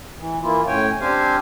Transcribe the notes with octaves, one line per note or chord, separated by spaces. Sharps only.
E3
E3 A#3 E4 F4
A2 C#4 C#5 G5 G#5
C4 D4 G4 C5 F5 G#5